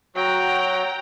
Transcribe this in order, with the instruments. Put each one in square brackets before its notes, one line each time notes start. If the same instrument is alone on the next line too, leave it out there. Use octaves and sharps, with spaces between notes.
[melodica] F#3 F#4 [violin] G5 A#5